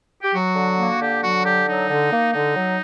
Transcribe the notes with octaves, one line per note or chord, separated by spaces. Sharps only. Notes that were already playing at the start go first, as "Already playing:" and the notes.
G4
F#3 F#4
D3
A#3
D3 G4
F#3 F#4
D3 G4
F#3 D#4
D3
A#3
D3 D#4
F#3